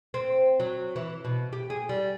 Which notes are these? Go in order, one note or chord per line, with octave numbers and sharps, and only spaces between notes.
C4
F#3
E3
B2
G4
G#4
G3